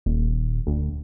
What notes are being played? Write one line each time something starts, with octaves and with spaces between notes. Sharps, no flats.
D#1
D2